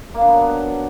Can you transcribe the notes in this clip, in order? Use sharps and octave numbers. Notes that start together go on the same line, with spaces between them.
A#3
D4
B3
F#3
B3